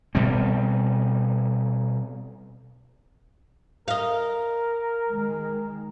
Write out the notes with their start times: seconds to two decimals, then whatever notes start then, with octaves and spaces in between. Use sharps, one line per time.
0.15 B2 G3 C4
3.88 A#4 D#5 F5
5.12 D#3 G#3